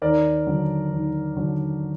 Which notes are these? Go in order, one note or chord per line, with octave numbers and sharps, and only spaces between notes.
D#2 A#4 D5
D3 F#3
D#2
D3 F#3